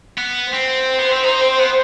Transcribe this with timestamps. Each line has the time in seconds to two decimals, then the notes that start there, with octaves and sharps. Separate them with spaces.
0.18 B3
0.53 C4 C5
0.99 B3
1.12 C4
1.24 D#4
1.41 C4
1.59 B3